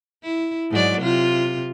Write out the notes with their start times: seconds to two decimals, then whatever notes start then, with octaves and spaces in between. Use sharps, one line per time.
0.23 E4
0.71 G#2 F#3 D5
1.01 C3 F4